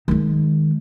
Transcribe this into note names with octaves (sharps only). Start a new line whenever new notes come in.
D#3 G#3